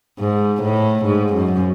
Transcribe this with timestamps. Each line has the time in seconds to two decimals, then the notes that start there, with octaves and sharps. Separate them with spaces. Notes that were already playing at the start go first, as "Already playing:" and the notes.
0.19 G#2
0.62 A2
1.05 G#2
1.34 F#2